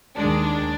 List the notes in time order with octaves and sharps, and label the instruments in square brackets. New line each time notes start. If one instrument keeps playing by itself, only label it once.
[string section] D#2 D#3 G#3 D4